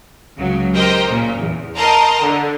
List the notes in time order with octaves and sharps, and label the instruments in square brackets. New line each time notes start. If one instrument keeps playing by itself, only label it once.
[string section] C#2 C#3 F#3
G4 A#4 C5 D#5 G5 A#5
A#2 C#3
E2
A#4 D#5 G5 A5 A#5 C6
D3